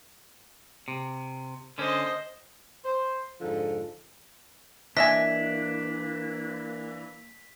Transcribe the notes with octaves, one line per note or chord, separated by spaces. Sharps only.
C3
D3 C#4 C5 D#5
C5
F2 G#2 D3 F3 A4
E3 A#3 D4 D#5 E5 G#5 B6